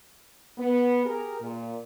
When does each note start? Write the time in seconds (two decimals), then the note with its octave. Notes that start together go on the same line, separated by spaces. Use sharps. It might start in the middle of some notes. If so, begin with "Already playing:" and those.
0.58 B3
1.05 G4 G#4 A#4
1.41 A#2